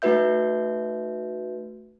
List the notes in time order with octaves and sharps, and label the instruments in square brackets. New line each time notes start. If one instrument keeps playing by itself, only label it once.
[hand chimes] A3 D#4 F#4 B4 E5 G6